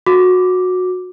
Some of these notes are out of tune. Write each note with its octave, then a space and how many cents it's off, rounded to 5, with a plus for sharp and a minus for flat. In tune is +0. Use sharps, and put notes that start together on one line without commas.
F#4 -20 D6 +0